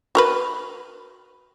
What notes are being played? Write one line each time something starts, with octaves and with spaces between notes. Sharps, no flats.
F#4 A#4 B4